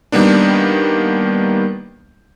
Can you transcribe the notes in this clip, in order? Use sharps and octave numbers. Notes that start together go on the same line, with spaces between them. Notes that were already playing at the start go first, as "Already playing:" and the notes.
D#3 G3 A#3 B3 D4